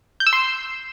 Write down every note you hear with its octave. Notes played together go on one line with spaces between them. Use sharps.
G6
E6
C6